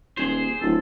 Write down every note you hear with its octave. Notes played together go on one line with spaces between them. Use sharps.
D#1 G#4 C5
D1 A4